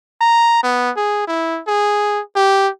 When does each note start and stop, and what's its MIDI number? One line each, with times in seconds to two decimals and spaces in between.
0.21 0.62 82
0.63 0.91 59
0.97 1.27 68
1.27 1.60 64
1.67 2.21 68
2.36 2.69 67